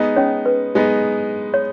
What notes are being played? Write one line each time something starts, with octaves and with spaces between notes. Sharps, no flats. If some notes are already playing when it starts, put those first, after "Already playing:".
Already playing: G#3 B3 D#4
C#4 C#5
B4
G#3 B3 D#4
C#5